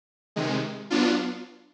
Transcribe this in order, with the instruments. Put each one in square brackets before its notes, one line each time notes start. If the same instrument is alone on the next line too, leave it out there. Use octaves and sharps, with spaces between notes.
[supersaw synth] C3 D#3 G#3
F#3 B3 D4 F4